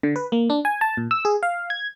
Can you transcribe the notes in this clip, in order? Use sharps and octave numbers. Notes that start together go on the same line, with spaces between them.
D3
B4
A#3
D4
G#5
A5
A#2
E6
G#4
F5
G#6